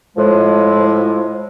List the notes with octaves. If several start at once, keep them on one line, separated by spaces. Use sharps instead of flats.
A2 F3 G#3